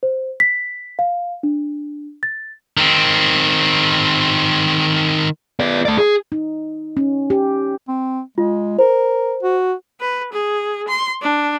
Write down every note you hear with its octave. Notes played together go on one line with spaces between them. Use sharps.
C5
B6
F5
D4
A6
D#3 C4
B3 D5
A3 D5
G#4
D#4
C#4
G4
C4
G#3 F4
A#4 C5
F#4
B4
G#4
C6
D4